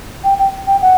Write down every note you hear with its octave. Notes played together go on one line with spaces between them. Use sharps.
G5
G5
G5
F#5